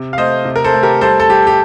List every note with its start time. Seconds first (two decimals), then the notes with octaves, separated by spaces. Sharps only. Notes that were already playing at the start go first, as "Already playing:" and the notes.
Already playing: C3
0.13 F5
0.18 A3 C5 D#5
0.45 C3
0.56 A#4
0.64 A4 C5
0.74 A3
0.83 G4 A#4
1.01 G3 A4 C5
1.20 A4
1.29 G3 G4
1.47 G4